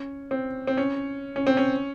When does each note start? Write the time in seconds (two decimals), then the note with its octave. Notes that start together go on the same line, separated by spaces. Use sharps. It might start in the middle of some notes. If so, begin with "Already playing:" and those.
Already playing: C#4
0.31 C4
0.67 C4
0.77 C#4
1.36 C#4
1.47 C4
1.57 C#4